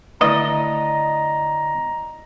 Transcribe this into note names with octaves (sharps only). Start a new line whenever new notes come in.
D3 A3 E4 D#5 A#5